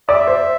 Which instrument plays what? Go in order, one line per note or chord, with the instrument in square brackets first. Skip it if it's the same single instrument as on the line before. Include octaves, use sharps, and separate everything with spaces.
[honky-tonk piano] D5 [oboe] E5
[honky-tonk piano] C5